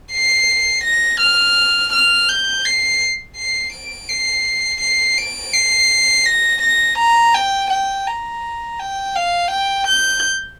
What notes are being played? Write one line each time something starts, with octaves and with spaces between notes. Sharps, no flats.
C7
A#6
F6
F6
G6
C7
C7
D7
C7
C7
D7
C7
A#6
A#6
A#5
G5
G5
A#5
G5
F5
G5
G6